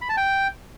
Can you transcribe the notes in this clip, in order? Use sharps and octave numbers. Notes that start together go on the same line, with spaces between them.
B5
A5
G5